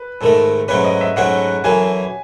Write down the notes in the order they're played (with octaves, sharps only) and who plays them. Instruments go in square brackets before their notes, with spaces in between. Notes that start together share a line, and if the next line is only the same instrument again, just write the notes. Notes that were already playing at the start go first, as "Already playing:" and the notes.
Already playing: [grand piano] B4
[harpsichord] G#2 D#3 A3 [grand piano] A4
[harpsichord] G#2 F#3 A3 C#4 [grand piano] B4
[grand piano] D#5
E5
[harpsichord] G#2 F#3 A3 C#4 [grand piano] F#5
[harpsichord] F#2 E3 A3 [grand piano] G#5